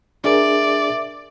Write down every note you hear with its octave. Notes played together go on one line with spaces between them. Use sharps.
D4 G#4 A#4 D5 E5